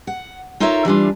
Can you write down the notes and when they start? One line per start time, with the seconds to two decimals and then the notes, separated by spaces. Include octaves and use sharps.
0.07 F#5
0.60 D#4 F4 A4 A#4 C#5 E5
0.85 E3 G3 D4 F4